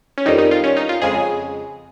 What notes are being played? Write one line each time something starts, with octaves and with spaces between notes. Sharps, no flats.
C#4
F2 D#3 G3 D#4
D#4
F4
C#4
D#4
F4
F2 C#3 G#3 G#4